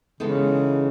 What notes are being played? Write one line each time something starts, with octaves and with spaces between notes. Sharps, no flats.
C#3 E3 G#3 B3 D#4 A4